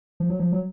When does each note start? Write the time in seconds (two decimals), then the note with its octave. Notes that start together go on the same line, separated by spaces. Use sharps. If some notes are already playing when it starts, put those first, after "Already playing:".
0.20 F3
0.29 F#3
0.39 F3
0.52 F#3